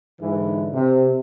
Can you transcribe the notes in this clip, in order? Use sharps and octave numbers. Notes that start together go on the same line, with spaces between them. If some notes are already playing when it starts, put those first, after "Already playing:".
G#2 D3 E3
C3